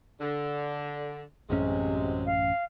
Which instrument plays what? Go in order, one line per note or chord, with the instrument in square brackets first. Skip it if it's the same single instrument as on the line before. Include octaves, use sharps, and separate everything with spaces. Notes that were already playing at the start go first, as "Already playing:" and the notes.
[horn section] D3
[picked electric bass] A1 F#2 C#4 [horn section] C3 F#3 G#3
[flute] F5